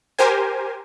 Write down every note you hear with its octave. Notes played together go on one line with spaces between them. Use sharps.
G4 A#4 C5 G#5